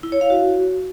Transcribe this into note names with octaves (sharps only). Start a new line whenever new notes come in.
E4
C#5
F5
F#4